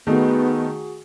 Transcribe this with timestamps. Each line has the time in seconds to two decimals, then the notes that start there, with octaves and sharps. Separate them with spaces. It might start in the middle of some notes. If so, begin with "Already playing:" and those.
0.07 D#3 A3 B3 F#4 G#4